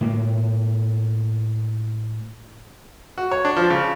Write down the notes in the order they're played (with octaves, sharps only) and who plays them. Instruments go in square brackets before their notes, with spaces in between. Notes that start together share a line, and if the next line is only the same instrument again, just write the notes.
[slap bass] A2 A#3
[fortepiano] F#4
C#5
D4
F3
C#3